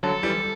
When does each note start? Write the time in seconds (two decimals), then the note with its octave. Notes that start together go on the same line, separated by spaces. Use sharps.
0.03 D3 F#3 A4
0.23 E3 G3